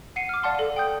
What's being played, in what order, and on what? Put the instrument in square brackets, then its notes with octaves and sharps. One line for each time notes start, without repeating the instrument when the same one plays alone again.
[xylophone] F#5 C7 C#7 D#7
D6 F6
D5 F5 F#5 A5 C6
A4
G5 D#6 G6